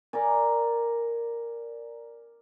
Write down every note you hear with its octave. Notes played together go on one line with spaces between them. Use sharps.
A#4 D5 G#5